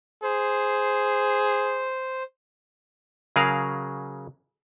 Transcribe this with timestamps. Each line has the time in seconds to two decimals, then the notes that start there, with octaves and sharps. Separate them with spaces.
0.23 G#4 C5
3.36 C#3 F#3 G#4 A#4 F5